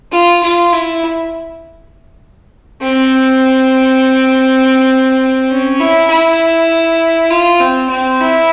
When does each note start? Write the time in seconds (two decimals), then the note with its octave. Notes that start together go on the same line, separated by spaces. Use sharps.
0.12 F4
0.43 F4
0.73 E4
2.82 C4
5.51 C#4
5.80 E4
6.10 E4
7.31 F4
7.60 C4
7.89 C4
8.20 E4